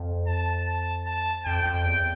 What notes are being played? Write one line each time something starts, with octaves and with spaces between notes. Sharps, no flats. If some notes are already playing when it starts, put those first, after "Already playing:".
Already playing: F2
A5
A5
A5
F2 G5
F2
E2